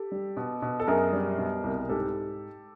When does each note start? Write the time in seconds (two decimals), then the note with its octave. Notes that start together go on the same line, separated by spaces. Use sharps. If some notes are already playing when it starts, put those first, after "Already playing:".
Already playing: G4 A4
0.12 G3
0.37 B2
0.62 B2
0.80 A4
0.87 F#2 G#4 A#4
1.13 G3
1.38 B2
1.64 C2
1.89 G#2 G4 A4